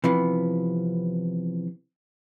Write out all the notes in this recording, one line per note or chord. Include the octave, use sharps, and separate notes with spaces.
C3 E3 F3 B3